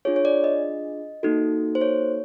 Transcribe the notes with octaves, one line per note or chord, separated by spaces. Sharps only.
D4 F4 G#4 C#5
C#5
D5
D#5
A#3 D#4 F#4 A4
C5
C#5